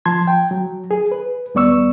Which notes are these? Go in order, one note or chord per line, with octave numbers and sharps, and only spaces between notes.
F3 A5 C6 G#6
G5
F#3
G#4
B4
D#2 G3 B3 D5 C#6 E6